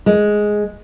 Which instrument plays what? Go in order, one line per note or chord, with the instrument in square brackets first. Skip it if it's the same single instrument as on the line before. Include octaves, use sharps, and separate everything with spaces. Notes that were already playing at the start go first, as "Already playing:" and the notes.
[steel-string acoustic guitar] G#3